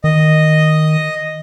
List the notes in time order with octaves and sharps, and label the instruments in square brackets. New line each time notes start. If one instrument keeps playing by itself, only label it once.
[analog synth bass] D#3 [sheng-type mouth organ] D#5